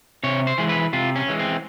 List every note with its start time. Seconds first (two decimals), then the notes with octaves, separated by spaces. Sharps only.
0.23 C3 C#5
0.47 C5
0.58 E3 G#3
0.69 B4
0.93 C3 F4
1.16 C#4
1.28 E3 G#3
1.39 C4